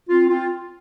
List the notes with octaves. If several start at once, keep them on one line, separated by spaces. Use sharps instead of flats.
C4 F4
C4 F4